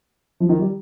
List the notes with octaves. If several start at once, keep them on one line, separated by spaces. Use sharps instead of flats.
F3
D#3
G3